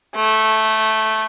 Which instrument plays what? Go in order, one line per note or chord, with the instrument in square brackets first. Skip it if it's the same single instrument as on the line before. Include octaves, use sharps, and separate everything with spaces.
[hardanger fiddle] A3